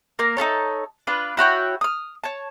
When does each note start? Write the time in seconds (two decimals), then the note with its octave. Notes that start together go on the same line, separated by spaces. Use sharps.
0.19 A#3 A#4
0.37 D#4 E4 A4 C#5
1.07 D4 F4 B4
1.37 E4 F#4 C#5 G5
1.81 D#6 F6
2.24 C#5 A5